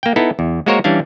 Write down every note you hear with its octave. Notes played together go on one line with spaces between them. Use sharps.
A#3 G5
B3 D#4 E4 A4
E2
G#3 A#3 F#4 A#4 C5 C#5
E3 G3 C#4 D4 F5